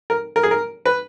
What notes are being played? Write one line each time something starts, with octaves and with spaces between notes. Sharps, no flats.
A#4
A#4
G#4
A#4
B4